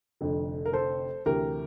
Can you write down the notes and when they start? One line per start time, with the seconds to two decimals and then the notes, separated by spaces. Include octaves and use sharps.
0.21 F1 F2 D3
0.66 A#4
0.73 A4 C5
1.26 D2 C3 E3 G4 A#4